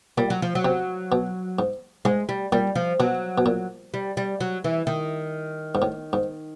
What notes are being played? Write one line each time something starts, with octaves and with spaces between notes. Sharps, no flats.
A#2 G3
F#3
F3
F#3
C3
B2
G#2
G#2 G#3
G3
A#2 G3
F3
B2 F#3
B2
A#2
G3
G3
F#3
E3
D#3
G#2
A2
G#2